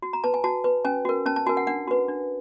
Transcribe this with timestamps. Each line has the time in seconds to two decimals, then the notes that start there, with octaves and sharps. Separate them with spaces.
0.02 F#4
0.13 A#5
0.24 B4 A5
0.34 G#5
0.44 F#4 A5
0.64 B4
0.85 C#4 G#5
1.05 F#4 A#4
1.26 C#4 A5
1.36 A5
1.47 F#4 A#4 G#5
1.57 F#5
1.67 D4 F#5
1.88 F#4 B4
2.08 D4